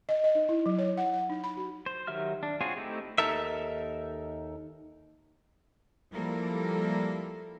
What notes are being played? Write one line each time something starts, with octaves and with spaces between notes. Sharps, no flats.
D#5
D#5
D#4
E4
F#3
C#5
F#5
F#5
D#4
B5
F#4
C5
D#3 F#3 G4 E5 F6
D4
C4 F4 F#4 G#4 C#5
A3 C4 D#4 E4 G4
D#2 D#4 A4 A#4 E5
F3 G3 A#3 E4 A4 A#4